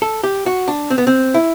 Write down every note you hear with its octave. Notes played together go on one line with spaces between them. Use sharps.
A4
G4
F#4
D4
C4
B3
C4
E4